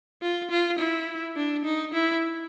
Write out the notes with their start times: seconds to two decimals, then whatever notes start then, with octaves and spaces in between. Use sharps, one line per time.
0.22 F4
0.51 F4
0.79 E4
1.37 D4
1.65 D#4
1.94 E4